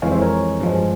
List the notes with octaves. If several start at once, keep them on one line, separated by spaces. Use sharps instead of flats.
F2 E3 G#3 C#5 F5
C5 E5
A#4 C#5
G2 F3 G#3